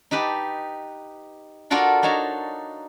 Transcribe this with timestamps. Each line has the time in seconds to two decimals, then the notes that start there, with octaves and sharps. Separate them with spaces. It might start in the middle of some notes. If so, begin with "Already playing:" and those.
0.11 D#4 G4 B4 A5
1.70 D4 F4 F#4 A4 A#4 D5
2.03 D4 D#4 C#5 A5 A#5